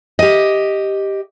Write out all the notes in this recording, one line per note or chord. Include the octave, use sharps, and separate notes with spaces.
G4 D#5